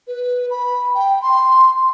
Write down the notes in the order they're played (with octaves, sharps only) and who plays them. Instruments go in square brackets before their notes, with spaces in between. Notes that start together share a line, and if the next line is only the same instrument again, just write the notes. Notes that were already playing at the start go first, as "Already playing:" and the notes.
[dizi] B4
B5
G5
C6